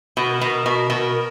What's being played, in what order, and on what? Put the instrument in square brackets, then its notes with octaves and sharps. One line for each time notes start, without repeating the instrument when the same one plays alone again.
[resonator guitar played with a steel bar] B2 [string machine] A#4
[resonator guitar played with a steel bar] B2
B2
B2